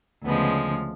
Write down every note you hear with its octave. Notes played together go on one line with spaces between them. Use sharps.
D2 C#3 F3 G#3 B3